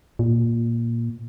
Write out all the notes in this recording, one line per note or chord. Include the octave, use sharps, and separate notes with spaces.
A#2